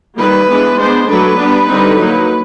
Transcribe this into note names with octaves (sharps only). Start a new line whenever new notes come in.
D#3 G3 A#3 B4
E3 G#3 B3 D4
G#3 B3 D4 C5
F#3 A3 D4 B4
G3 B3 D4
D3 G3 C4 D#4
F#3 A#3 D#4